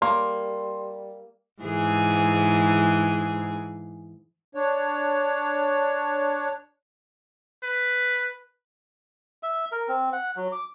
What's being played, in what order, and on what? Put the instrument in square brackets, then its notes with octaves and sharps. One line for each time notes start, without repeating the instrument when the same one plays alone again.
[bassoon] G3 [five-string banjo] A#3 [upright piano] C6
[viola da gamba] G#2 E3 G#4
[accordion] D4 C#5
[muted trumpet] B4
[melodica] E5
A#4
C4
F#5
F#3
D6